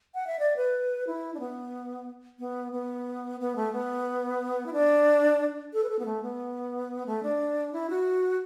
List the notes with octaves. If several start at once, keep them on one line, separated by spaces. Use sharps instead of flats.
F#5
E5
D5
B4
E4
D4
B3
B3
B3
B3
A3
B3
E4
D4
A4
B4
A4
B3
A3
B3
A3
D4
E4
F#4